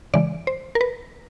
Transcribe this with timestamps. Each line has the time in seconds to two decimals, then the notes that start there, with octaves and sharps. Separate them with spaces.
0.14 C#3 E3 G#3 D5
0.47 C5
0.75 A#4
0.81 B4